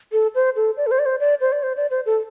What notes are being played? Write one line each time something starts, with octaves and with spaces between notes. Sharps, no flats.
A4
C5
A4
D5
A4
C5
D5
C5
D5
C5
D5
C5
D5
C5
A4